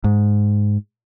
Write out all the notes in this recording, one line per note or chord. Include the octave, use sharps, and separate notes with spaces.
G#2